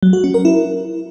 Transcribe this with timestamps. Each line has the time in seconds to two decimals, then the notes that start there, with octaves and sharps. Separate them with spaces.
0.03 F#3
0.13 F#4
0.24 C#4
0.34 A#4
0.45 E4